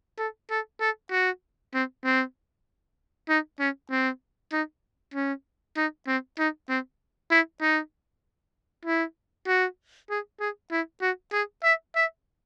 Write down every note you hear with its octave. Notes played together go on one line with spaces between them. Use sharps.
A4
A4
A4
F#4
C4
C4
D#4
C#4
C4
D#4
C#4
D#4
C4
D#4
C4
E4
D#4
E4
F#4
G#4
G#4
E4
F#4
G#4
E5
E5